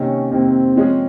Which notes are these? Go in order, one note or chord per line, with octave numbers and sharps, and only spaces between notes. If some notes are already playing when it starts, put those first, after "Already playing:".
Already playing: C3 D#3 A#3 C#4
C3 D#3 A#3 C4
F3 G#3 C#4 G#4